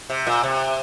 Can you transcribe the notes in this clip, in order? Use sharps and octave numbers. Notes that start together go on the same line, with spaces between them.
C3
A#2
C3